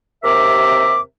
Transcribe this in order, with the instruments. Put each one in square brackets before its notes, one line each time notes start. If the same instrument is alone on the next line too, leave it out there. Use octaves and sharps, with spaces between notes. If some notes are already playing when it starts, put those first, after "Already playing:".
[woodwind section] D#2 C3 A#4 E5 D6